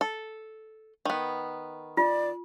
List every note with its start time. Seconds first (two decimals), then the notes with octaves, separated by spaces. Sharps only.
0.01 A4
1.05 D#3 B3
1.97 F4 D5